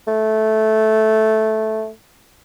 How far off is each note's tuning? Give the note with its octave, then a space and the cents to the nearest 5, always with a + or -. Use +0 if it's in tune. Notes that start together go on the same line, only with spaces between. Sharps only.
A3 -10